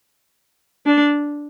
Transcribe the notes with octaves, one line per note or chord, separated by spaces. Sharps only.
D4